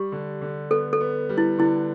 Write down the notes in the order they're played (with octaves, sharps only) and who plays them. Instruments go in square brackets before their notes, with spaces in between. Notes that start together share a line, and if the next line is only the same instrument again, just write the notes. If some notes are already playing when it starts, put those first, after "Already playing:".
Already playing: [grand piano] G3 [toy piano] G4
[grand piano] D3
D3
[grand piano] B3 [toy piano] A4
[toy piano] A4
[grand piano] B3
G3
[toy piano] E4
[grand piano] D3 [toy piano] E4